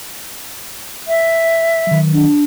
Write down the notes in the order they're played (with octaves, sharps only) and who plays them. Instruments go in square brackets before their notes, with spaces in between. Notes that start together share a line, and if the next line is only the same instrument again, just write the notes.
[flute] E5
[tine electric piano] D#3 F#3
[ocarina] D4